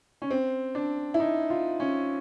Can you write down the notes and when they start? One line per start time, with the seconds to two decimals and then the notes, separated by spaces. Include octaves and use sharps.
0.22 C#4
0.31 C4
0.75 D4
1.14 E4
1.20 D#4
1.50 F4
1.80 C#4